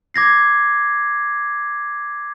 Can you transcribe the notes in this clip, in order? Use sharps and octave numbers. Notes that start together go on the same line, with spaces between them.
D6 G#6 A#6 C7